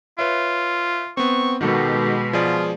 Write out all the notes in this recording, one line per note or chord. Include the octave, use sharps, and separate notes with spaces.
F4 B4 C#5 E5
B3 C4 C#6
B2 D#3 G#3 F#4 G4 A4
F3 F4 G#4 D5